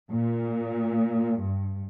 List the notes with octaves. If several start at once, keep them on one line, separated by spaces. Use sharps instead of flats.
A#2
G2